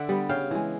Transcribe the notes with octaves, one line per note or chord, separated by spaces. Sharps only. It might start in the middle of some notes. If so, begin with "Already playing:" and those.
Already playing: D3 D5 E5 F#5
G3 B3
C#3 F5 G5
E3 G#3